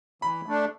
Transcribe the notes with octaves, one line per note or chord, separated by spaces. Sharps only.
E3 B5
A3 D4